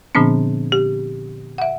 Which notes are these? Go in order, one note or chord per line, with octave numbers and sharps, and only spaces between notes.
A#2 D3 F3 B3 C4 D4
G4
E5 F#5